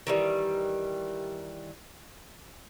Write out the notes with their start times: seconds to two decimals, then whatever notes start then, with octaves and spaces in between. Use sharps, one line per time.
0.07 D#3 E3 G3